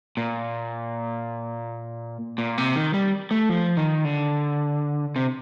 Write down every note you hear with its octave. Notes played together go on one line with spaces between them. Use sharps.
A#2
A#2
C3
D#3
G3
A3
F3
D#3
D3
C3